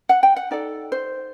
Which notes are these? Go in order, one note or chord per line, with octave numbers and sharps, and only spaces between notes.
F#5
G5
F#5
D#4 A4 D5
C5